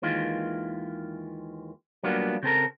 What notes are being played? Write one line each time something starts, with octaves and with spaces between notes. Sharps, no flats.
D#2 D#3 E3 G#3 F4
F#3 G3 A#3 B3 D4 F4
C#3 C4 A4 A#4